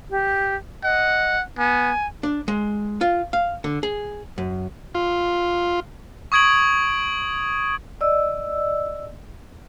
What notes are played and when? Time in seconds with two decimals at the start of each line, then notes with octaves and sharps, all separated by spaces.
0.10 G4
0.84 D#5 F#5
1.58 B3 G#5
2.23 D4
2.48 G#3
3.01 F4
3.33 F5
3.64 D3
3.83 G#4
4.38 F#2
4.95 F4
6.32 C#6 D#6 G#6 D7 F#7
8.01 D5 D#5 E6